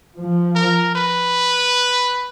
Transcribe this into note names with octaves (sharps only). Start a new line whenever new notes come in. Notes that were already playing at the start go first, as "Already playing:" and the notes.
F3
A#4
B4